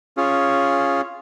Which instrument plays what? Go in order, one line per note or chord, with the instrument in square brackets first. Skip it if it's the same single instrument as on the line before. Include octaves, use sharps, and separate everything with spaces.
[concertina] C#4 F4 G#4